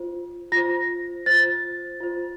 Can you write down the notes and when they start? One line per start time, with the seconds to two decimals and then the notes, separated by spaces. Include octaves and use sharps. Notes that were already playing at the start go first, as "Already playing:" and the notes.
Already playing: F4 C5
0.52 F4 C5 A#6
1.26 F4 C5 A6
2.01 F4 C5